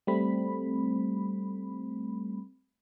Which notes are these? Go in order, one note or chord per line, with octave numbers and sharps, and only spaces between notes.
G3 A3 C4 B5